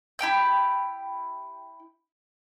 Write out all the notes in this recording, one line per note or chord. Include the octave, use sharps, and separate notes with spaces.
E4 G4 G5 G6